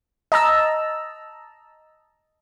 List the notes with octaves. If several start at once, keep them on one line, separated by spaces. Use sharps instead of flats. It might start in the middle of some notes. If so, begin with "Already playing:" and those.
D#5 A5 A#5 E6